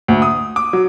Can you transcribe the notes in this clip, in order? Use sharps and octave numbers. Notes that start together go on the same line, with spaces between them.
D2
D#6
D6
F#3